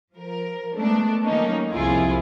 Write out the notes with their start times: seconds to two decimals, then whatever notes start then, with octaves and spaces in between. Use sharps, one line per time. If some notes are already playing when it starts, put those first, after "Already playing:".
0.14 F3 A#4
0.75 G#3 A3 B3 D4
1.24 D#3 F#3 A#3 C#4 D#4
1.71 C2 F2 C3 E4 F4 G#4